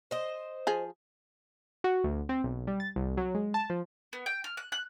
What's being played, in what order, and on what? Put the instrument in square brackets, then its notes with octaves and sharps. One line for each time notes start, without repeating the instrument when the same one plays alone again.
[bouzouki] C5 D#5
[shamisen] F3 G#4
[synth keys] F#4
D2
C4
B1
G3
A6
C2
F#3
G#3
A5
F3
[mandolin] B3
G5
F6
F#6
F#6